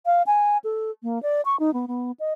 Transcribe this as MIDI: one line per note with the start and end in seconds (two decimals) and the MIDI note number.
0.06 0.22 77
0.27 0.58 80
0.64 0.91 69
1.03 1.21 58
1.23 1.41 74
1.45 1.56 85
1.60 1.73 63
1.74 1.86 59
1.88 2.12 59
2.20 2.33 75